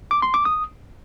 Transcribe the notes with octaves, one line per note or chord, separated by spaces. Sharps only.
D6
C6
D6
D#6